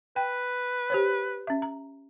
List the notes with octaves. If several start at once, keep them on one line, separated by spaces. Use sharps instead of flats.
B4 G5
G4 C5 C#5
C#4 E5
A#5